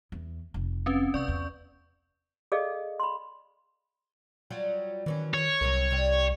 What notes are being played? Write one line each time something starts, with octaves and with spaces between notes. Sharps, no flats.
E2
F1
C4 C#4 B4
C3 D5 C#6 G6
E2
G#4 A4 D5 D#5 F5
B5 C6
F#3 G3 F4
D#3 E3 F#3 C#4
C#5
C2 C3 F#3 A#4
C3 G3 G4